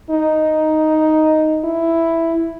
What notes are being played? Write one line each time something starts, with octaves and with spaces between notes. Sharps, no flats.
D#4
E4